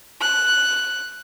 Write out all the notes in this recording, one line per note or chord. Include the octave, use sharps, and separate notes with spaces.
F#6